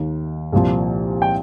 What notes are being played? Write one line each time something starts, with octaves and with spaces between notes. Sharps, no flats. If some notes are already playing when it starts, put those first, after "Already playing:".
Already playing: D#2 D#3
C2 A#2 F3
G5